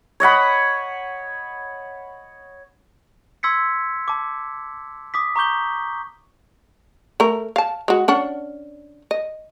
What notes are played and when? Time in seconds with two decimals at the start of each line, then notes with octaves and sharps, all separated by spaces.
0.20 C#5 D#5 F#5 B5
3.43 C6 E6 G#6 B6 C#7
4.08 A5 D6
5.14 D6 D#6 B6
5.36 A#5 C#6 D6 G6 G7
7.20 A3 A#4
7.56 F5 A5
7.88 G#3 F#4
8.08 C#4 D4 F#5
9.11 D#5